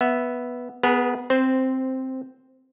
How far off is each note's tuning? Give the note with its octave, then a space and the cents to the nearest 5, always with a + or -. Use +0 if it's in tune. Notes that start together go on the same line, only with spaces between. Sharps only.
B3 -5 E5 +5
B3 +0 G#4 +0 B4 -45
C4 +0 C5 -10